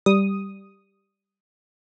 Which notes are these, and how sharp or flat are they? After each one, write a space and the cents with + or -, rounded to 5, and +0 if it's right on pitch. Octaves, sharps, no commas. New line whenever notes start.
G3 +0 D#6 +0